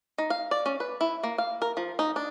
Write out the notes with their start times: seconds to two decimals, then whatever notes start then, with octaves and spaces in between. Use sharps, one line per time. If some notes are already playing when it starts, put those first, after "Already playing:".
0.18 D#4
0.30 F5
0.51 D5
0.66 C#4
0.80 B4
1.01 E4
1.24 A#3
1.38 F5
1.62 A#4
1.77 F3
1.99 D#4
2.16 D4